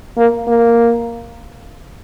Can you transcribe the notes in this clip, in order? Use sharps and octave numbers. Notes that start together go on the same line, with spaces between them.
A#3
A#3